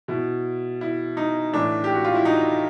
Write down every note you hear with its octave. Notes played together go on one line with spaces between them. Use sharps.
B2 E4
E4
D#4
A2 E3 D4
G4
F#4
F4
E4
D#4